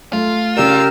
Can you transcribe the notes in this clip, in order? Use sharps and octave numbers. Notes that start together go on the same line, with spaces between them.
A3 F4
C#3 G4 A#4 D5 E6 F6